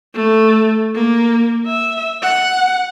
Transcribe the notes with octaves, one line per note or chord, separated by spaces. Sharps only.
A3
A#3
E5
F#5